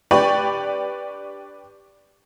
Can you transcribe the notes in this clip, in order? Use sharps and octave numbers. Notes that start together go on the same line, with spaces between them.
D4 G4 B4 D5 G5 C#6